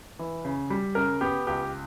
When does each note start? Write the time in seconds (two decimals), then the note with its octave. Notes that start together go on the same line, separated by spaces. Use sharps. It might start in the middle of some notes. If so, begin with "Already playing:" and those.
0.19 E3
0.45 C#3
0.70 G3
0.95 C#3 A#4
1.21 B3 G4
1.47 C#2 G4